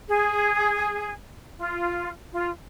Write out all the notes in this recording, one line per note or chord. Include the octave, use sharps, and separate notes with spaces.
G#4
F4
F4